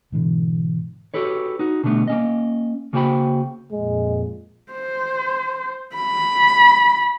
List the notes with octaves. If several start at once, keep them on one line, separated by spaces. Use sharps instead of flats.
G#2 B2 D3 E3
F#4 G4 A4 B4 C#5
D#4 F#4
B2 D3 G3 A3 B3
A#3 C#4 D#5
C#3 A#3 F#4 C5 G5 B5
F2 A#2 G#3
C5
B5